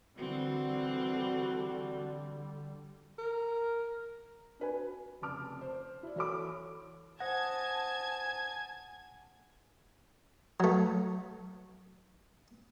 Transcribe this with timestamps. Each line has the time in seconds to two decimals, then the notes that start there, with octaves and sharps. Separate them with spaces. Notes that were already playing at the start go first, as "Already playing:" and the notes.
0.18 D3 E3 G3 C4 F#4
3.18 A#4
4.60 D4 B4 G#5
4.71 F#4
5.21 F1 C#3 A5 D6 F6
5.61 C5
6.03 E4 D5
6.16 E3 F#4 A4 C#5 B5 D6
7.20 C5 F#5 G#5 A5 D#6 G#6 A#6
10.60 F#3 A3